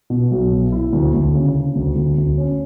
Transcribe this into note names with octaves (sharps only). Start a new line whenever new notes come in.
B2
B1
B2
E4
D2
D2
C#3
C#3
D2
D2
D2
C#4